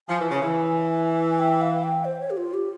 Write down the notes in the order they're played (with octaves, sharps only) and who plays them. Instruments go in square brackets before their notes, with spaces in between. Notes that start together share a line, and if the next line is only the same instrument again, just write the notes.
[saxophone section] F3 [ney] G#5
[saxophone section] E3
C#3
E3
[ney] G#5
G5
F5
G5
C5
C#5
G4
F4
G4